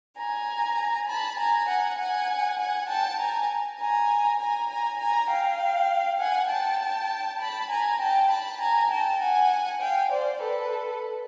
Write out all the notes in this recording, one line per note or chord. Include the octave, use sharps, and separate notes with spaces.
G#5 A#5
A5 B5
G#5 A#5
F#5 G#5
F#5 G#5
F#5 G#5
G5 A5
G#5 A#5
G#5 A#5
G#5 A#5
G#5 A#5
G#5 A#5
F5 G5
F#5 G#5
G5 A5
A5 B5
G#5 A#5
G5 A5
A5 B5
G#5 A#5
G5 A5
F#5 G#5
F5 G5
C5 D5
A4 B4